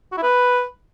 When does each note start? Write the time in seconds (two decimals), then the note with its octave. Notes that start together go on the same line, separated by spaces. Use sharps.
0.12 F#4
0.17 E4
0.23 B4